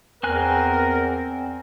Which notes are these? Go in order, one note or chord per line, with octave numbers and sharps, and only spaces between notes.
E2 C4 A#4 G#5 F#6